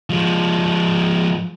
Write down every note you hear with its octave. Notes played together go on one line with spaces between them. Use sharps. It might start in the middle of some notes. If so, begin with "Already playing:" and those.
F3 G#3